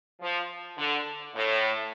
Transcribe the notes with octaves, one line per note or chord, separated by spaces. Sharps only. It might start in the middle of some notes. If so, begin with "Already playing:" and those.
F3
D3
A2